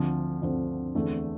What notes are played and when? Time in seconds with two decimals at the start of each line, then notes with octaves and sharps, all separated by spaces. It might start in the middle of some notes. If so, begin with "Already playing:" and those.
Already playing: D2 D3 F3 C4
0.42 D2 D3 F3 C4
0.95 E2 D3 A3 C4